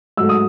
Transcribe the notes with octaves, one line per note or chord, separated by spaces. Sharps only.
G#2 F#3 A3 E6
D#6